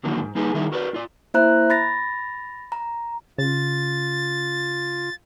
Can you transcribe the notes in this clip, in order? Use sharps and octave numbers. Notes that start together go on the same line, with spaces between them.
D3 D#3 F3 F#3 A#3 D4
G#2
G3 A#3 D#4 G#4 A4 B4
D#3 G3 D#4 E4 G#4 A#4
F#4 A#4 B4 D5
F4 D5
A#3 E4 C5 E5 A#5 F#6
B5 A6 A#6
A#5
C#3 F4 A6